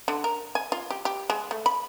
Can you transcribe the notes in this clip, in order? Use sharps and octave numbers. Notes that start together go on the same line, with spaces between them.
D3
A#4
G#5
F4
G4
G4
G#3
A3
B5